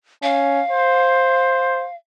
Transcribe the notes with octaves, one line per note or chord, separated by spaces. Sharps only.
C#4 F5
C5